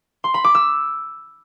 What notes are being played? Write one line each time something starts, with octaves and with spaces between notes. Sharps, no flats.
C6
B5
D6
E6